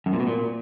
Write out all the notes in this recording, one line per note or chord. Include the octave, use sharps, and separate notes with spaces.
F#2
A#2
B2
A#2